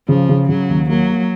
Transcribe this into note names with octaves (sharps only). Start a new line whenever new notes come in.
C#3 F3
C#3
C#3 F#3
D#2
F#3 A#3
A#3